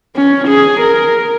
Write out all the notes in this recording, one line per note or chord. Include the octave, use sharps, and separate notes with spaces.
C#4
G#4
A#4